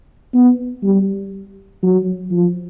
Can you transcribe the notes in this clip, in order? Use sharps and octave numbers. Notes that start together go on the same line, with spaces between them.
B3
G3
F#3
F3